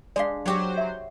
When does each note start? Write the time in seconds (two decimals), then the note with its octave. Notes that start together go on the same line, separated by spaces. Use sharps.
0.16 G#3 D4 D5 F5 C6
0.46 F#3 F#4 G4 C5 C#5
0.77 E5 C6